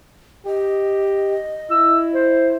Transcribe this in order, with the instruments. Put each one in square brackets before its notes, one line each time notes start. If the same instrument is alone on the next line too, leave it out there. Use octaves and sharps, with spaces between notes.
[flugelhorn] G4 [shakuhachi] D#5
[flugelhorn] E4 [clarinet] E6
[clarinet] C5